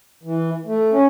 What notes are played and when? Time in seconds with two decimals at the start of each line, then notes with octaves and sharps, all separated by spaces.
0.23 E3
0.66 A3
0.92 C#4